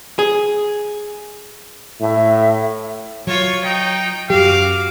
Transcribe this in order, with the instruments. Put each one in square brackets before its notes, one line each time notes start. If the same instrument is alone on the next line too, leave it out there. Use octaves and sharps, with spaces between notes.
[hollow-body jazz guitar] G#4
[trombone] A2 [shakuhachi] E5
[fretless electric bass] F#3 [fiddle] F4 C#5
[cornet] D#4 [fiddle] G5
[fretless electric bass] F#2 F#3 [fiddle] F#4 D6 [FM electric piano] G4 [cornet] F5